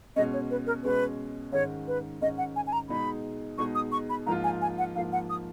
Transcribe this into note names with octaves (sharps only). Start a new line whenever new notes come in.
B2 G#3 C#4 D#5
C#5
B4
A#4
B2 G#3 C#4 B4
G#2 D#3 G#3 C#4 C#5
B4
G#2 D#3 G#3 C#4 D#5
F#5
G#5
G#5
A#5
B2 G#3 D#4 G#4 B5
B2 G#3 D#4 G#4 C#6
D#6
C#6
B5
G#2 F3 A#3 F4 A#5
G#5
G#5
F#5
G#2 F3 A#3 F4 F5
F#5
D#6